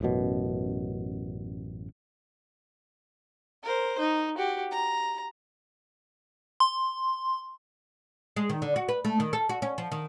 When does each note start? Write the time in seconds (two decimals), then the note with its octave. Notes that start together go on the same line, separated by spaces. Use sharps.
0.01 A1 F#2 B2
3.64 A#4 C5
3.99 D#4
4.38 F#4 G4
4.71 A#5
6.60 C6
8.36 G#3
8.50 D#3
8.62 D3
8.76 F#4
8.88 B4
9.05 A3
9.20 D#3
9.33 A4
9.49 F#4
9.62 C#4
9.78 F3
9.92 D#3